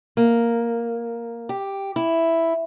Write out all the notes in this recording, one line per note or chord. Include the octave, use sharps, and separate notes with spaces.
A#3
G4
E4